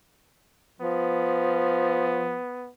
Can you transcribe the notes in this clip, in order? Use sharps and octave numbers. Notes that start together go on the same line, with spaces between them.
F3 B3